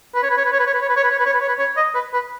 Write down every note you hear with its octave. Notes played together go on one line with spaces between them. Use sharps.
B4
C#5
B4
C#5
B4
C#5
B4
C#5
B4
C#5
B4
C#5
B4
C#5
B4
C#5
B4
C#5
B4
C#5
D#5
B4
B4